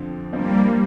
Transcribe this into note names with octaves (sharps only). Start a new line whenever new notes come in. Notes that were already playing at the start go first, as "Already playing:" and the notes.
Already playing: F2 D3 F3 C4
G2 F3 G3 A#3 C4